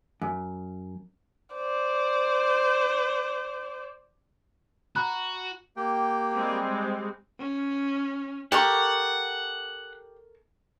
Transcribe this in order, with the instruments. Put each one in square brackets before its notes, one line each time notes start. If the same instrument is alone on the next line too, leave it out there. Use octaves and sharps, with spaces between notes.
[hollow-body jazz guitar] F#2
[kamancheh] C5 D5
[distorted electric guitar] F#4 [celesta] A#5 B5 F#6
[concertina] A#3 G4 G5
[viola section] G3 G#3 C4
[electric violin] C#4
[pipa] G4 [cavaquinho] A4 A#4 C#6 [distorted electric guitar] F#5